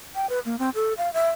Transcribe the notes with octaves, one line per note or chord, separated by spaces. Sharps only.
G5
B4
A#3
C4
A4
F5
E5